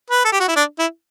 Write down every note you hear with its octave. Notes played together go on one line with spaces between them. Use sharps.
B4
A4
G4
F#4
E4
D4
E4